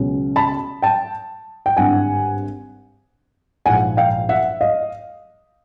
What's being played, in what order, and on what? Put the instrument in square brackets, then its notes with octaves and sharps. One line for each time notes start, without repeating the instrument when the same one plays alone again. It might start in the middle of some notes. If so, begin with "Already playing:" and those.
Already playing: [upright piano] C#2 B2 F#3
A5 B5
G5 A5
G5
G#1 G2 D3 F#5 G#5
A#1 G#2 F3 F#5 G#5
F5 G5
E5 F#5
D#5 F5